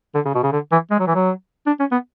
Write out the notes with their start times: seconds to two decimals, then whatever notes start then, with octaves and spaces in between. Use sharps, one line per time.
0.15 D3
0.25 C#3
0.35 B2
0.43 C#3
0.52 D3
0.71 E3
0.91 G#3
0.99 F#3
1.07 E3
1.15 F#3
1.66 D4
1.79 C#4
1.92 B3